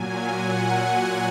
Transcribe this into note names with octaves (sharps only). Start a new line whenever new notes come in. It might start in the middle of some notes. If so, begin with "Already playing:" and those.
Already playing: A#2 F#3 G#5
F#5